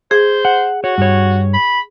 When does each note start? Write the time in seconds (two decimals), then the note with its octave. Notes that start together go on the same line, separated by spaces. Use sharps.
0.11 G#4 C5
0.45 F#5
0.84 F#4 C#5
0.98 G2 C#5
1.54 B5